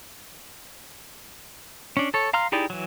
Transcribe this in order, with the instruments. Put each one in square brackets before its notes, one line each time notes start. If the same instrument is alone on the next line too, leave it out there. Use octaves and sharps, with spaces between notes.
[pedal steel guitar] C#4 D4
A4 C#5
F5 A#5 C6 F6
D#4 E4 G4 G#4 D5
E3 F#3